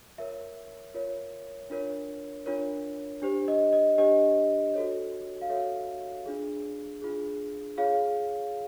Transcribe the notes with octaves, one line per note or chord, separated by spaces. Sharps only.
F4 A#4 C#5 E5
F4 A#4 C#5
D4 F4 A#4 C#5
D4 F4 A#4 C#5
D4 G4 C5
D#5
D#5
D4 G4 C5 D#5
F#4 A4 C#5
F5
F#4 A4 C#5 E5
D4 F4 G#4
D4 F4 G#4
F4 G#4 C#5 F5